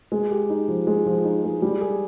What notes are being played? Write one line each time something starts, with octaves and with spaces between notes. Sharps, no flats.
G#3
G4
D#4
F3
G#3
F3
D#4
G#3
G3
G#4